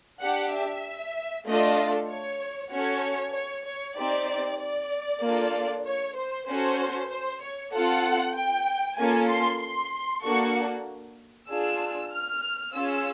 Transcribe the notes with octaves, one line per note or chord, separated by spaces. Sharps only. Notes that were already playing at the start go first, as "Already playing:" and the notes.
D4 G4 F#5
E5
A3 D4 F4 A4 D#5
C#5
C#4 F#4 A4 C#5
C#5
C#5
C4 D#4 G4 D5
D5
A#3 D4 F4 A4
C#5
C5
C#4 F#4 A4 C5
C5
C#5
C4 F4 A4 F#5
G5
A#3 C#4 F4 A4 G#5
C6
C6
A#3 D4 F#4 A4 C#6
D4 F4 G#4 E6
F6
C#4 F4 G#4 E6